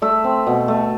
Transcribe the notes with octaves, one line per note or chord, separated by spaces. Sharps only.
A3 E5
C4
B2
A3